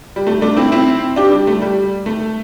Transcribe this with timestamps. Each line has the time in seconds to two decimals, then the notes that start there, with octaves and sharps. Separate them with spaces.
0.16 G3
0.27 A3
0.41 A3 D4
0.57 C4 E4
0.72 C4 E4
1.16 D4 G4
1.31 G3
1.47 A3
1.62 G3
2.06 A3